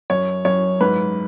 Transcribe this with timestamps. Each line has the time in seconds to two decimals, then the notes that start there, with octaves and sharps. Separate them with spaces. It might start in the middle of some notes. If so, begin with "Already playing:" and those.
0.10 F#2 C#5
0.45 F#2 C#5
0.81 G#2 B4